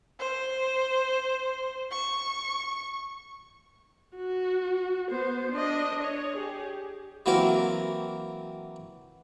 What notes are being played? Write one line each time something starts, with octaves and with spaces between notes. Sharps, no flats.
C5
C#6
F#4
B3 C5
D4 D#5
C#5
G4 G#4
E3 F#3 A#3 C4 A#4